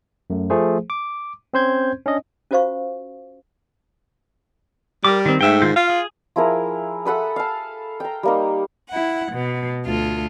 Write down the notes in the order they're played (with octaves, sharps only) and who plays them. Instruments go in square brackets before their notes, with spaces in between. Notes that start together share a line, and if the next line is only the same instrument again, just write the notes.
[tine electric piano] F#2 A3
F3 A3 G#4 C5
D6
C4 C#4 C5 C6 G6 G#6
C#4 D4 D#5
[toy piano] C#4 F4 F#4 C5 F5 C#6
[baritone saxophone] G3 [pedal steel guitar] A#4 D6
[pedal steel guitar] D#3 C4
[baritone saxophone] G#2 [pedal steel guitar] A3 E5 G5
[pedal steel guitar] D#3 F4 G6
[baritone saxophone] F4 [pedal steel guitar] F5
[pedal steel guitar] G#4
[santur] F3 E4 G#4 A#4
A4 F#5 B5 D#6
F5 A5
G5 A#5
G3 A#3 D#4
[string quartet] E4 F#5
B2
D2 F4 A4